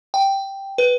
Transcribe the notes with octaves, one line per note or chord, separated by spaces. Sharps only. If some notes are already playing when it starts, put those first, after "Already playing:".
G5
B4